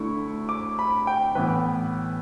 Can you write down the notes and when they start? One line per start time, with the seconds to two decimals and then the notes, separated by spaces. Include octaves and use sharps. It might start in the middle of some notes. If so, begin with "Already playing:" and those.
Already playing: D2 D3 A3 E4 C#6
0.49 D6
0.79 B5
1.07 G5
1.35 A2 E3 B3 B4